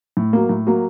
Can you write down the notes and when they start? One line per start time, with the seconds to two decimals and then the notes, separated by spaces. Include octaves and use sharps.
0.17 A2
0.33 F#3 A#3
0.49 A2
0.67 F#3 A#3